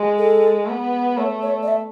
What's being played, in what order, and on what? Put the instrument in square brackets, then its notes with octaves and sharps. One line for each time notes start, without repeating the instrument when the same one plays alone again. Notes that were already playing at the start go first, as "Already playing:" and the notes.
Already playing: [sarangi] G#3
[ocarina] A4
[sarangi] B3
[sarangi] A3 [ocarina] C#5
[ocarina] C#5
D5
E5